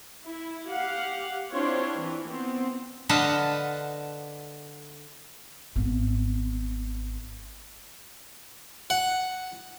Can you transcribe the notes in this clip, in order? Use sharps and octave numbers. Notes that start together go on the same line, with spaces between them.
E4
G4 F5 F#5
C4 D4 E4 F4 C5 C#5
E3
B3 C4
D3 B4 D#5 F5 F#5 A5
G#1 B3
F#5